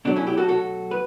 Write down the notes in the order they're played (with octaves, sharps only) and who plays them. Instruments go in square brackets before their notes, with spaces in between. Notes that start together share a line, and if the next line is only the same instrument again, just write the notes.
[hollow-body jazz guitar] B2 F#3 A3 D4
C#4 E4
E4 G4
F#4 A4
F#4 A4
B4